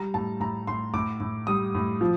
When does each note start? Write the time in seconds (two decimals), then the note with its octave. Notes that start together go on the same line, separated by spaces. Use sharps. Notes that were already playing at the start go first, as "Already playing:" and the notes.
Already playing: G3 A#5
0.14 A2 A5
0.40 A2 A#5
0.67 A2 C6
0.94 A2 D6
1.20 A2
1.47 G3 D#6
1.75 A2
2.01 F3